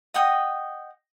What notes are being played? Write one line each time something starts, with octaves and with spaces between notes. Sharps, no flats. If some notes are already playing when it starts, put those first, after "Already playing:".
D#5 F#5 G5 D#6